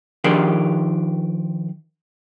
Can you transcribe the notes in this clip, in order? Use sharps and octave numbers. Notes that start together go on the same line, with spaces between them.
D#3 F3 D4 G4 G#4 A#4